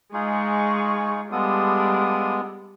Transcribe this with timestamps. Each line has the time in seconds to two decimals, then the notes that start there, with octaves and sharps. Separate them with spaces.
0.14 G#3 D#4 F4 G#4 C#6
1.32 G3 G#3 B3 D4 F4 A4 D#6